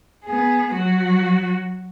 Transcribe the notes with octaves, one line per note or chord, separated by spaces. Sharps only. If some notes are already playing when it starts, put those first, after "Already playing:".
B3 G#4
F#3 F#4